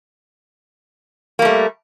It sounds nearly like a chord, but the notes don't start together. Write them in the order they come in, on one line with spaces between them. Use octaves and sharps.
A#3 G3 A3